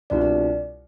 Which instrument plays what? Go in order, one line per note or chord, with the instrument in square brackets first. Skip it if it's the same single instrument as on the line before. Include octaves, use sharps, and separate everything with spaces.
[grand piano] C2 B2 G3 D4 F4 [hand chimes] D5
[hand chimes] D5